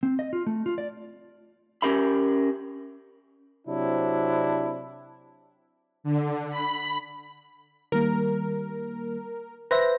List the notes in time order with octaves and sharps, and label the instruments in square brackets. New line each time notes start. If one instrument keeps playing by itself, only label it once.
[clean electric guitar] C4
D#5
F4
A3
F4
D5
C#4 G4 A#4 E5 B5
[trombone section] C3 F#3 C4 D4 E4
[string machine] D3
B5
[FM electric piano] D#3 G3 A#3 [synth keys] A#4
[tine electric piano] B4 C5 E5 [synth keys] A#6